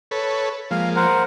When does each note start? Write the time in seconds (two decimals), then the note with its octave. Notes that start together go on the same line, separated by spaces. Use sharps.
0.11 A4 B4 C#5
0.71 F3 G#3 A#3 F5
0.96 A#4 C5 F#5